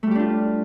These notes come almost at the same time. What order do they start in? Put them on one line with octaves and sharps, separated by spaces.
A3 G3 G4 D4 F4